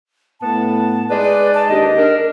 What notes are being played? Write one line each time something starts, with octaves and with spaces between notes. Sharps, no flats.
A2 B3 A5
G#3 D#4 B4 D5
A5
D#2 D4 G4 D#5
D4 A#4